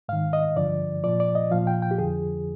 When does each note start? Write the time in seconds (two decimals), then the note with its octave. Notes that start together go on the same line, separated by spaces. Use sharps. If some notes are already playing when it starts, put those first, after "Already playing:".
0.09 G#2 D#3 F5
0.33 D#5
0.56 G2 D3 F3 D5
1.04 A#2 F3 D5
1.20 D5
1.35 D#5
1.51 A#2 F3 F5
1.67 G5
1.82 G5
1.91 G4
1.98 F2 D3 F3 G#4